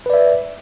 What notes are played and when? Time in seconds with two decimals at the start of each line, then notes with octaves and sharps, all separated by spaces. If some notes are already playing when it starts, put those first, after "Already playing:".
0.06 B4
0.10 D5
0.14 E5